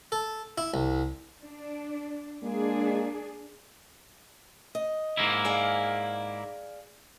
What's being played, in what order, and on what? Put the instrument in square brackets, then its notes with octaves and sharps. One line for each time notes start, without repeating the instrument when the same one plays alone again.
[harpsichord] A4
E4
C2
[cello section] D4
[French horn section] G#3 A#3 [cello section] D4 G#4
[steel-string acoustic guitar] D#5
[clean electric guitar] G#2 A#3 E4
[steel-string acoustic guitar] G#4 D5 F5